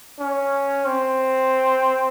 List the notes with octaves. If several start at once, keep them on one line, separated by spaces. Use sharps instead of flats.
C#4
C4